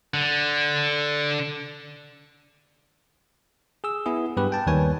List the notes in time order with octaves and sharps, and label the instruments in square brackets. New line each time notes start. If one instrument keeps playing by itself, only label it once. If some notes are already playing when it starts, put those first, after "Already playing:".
[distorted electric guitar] D3
[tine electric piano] G#4 E6
B3 E4 G#4
G2 B3 G4 B4
G5 A5
D#2 D#3 G3 B4 C#5 G#5